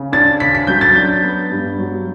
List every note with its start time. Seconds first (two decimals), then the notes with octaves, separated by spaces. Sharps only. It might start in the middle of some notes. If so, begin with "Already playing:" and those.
Already playing: C#3
0.12 D4 A6
0.40 C#3 B6
0.55 B6
0.67 F#3 G6
0.81 A6
0.95 D4 G6
1.23 B3
1.51 G2
1.78 F#3